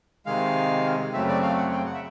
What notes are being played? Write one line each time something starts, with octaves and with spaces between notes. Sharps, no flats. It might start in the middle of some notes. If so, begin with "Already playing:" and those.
C3 D#3 G#3 F5
F#2 C#3 F#3 A3 C4 E5
D5
F5
F#5
G5
F#5
E5